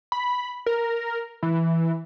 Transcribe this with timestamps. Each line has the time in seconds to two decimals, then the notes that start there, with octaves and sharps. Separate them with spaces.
0.12 B5
0.66 A#4
1.43 E3